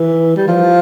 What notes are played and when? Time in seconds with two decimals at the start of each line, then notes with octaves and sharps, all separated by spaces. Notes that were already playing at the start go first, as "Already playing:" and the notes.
Already playing: E3
0.36 G3
0.48 F3